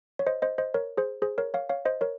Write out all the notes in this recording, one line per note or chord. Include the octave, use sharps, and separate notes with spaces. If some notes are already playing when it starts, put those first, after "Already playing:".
C#5
C5 D#5
C5 D#5
C5 D#5
A#4 C#5
G#4 C5
G#4 C5
A#4 C#5
C#5 F5
C#5 F5
C5 D#5
A#4 C#5